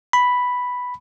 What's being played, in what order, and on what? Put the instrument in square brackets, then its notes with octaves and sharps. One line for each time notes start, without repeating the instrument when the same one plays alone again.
[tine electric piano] B5